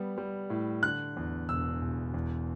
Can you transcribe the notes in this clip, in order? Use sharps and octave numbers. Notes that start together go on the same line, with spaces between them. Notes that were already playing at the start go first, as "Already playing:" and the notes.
Already playing: G3 B3
G3
A2
D3 F#6
E2
E1 E6
E1
E2